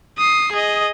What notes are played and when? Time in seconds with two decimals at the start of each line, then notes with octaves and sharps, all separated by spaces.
0.18 D#6 C7
0.53 G#4 D#5